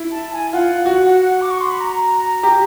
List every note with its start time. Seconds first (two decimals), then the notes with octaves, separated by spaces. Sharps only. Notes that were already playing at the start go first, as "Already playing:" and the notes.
Already playing: E4
0.11 A5
0.32 G#5
0.53 F4 F#5
0.86 F#4
1.41 D6
1.50 C#6
1.60 C6
1.70 B5
1.80 A#5
2.43 G4